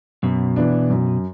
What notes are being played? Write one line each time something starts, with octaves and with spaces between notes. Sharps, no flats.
F#2 B2
E3 B3 D4
F#2